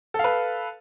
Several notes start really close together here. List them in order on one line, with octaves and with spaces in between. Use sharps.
A4 F5 B4